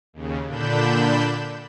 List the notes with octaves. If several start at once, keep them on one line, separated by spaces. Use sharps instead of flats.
D#2 C#3
A#2 D3 D4 B5 G6 E7